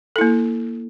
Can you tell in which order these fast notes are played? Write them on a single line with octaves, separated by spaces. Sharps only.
A4 E4 A#3